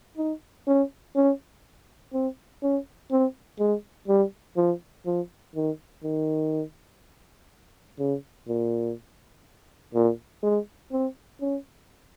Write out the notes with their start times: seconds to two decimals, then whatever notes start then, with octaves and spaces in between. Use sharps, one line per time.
0.17 D#4
0.67 C#4
1.15 C#4
2.13 C4
2.62 C#4
3.11 C4
3.59 G#3
4.08 G3
4.57 F3
5.06 F3
5.56 D#3
6.03 D#3
7.99 C#3
8.48 A#2
9.94 A#2
10.43 G#3
10.92 C4
11.41 C#4